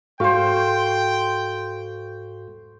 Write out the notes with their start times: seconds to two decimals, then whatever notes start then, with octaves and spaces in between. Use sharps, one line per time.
0.20 G#2 F#4 A4 C5 F5 G5 C#6